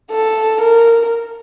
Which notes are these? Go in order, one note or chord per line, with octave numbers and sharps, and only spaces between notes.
A4
A#4